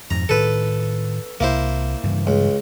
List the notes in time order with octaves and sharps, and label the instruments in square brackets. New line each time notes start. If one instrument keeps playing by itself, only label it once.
[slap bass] F2 G#2 [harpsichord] A#5
[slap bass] A2 D#3 [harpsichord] A4 B4
[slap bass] C2 [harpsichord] A#3 E4 C5
[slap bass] G2 C#3 E3
[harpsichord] C#2